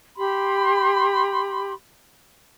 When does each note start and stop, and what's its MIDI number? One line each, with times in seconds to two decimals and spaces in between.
0.17 1.73 67
0.17 1.73 83
0.17 1.73 84